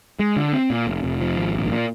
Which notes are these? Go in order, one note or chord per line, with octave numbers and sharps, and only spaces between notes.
G#3
D3
C4
A#2
F1
F1
F3
G#1
A#1
A#2